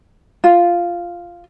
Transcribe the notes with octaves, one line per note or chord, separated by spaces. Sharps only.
F4